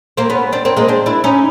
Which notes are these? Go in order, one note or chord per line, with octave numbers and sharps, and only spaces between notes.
A#3 C4
B3 C#4
C4 D4
A#3 C4
G#3 A#3
C4 D4
D4 E4
C#4 D#4